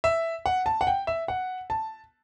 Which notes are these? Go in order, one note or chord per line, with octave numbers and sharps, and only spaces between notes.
E5
F#5
A5
F#5
G5
E5
F#5
A5